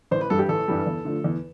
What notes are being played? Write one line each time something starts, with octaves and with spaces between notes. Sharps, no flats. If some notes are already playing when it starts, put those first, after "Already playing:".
A1 C5
B4
G2 E3 G3 A4
G4
A1 A4
G2 E3 G3
E2
D3 F3 A3
E2